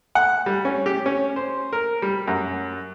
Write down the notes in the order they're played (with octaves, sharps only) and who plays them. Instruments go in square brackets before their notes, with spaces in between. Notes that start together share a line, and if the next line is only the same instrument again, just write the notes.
[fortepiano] F#5
G3
C#4
G4
C#4
C5
A#4
G3
F#2